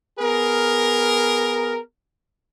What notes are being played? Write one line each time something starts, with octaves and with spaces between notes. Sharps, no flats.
B3 G#4 A#4